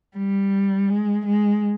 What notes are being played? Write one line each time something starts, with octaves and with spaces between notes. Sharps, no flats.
G3
G#3
G#3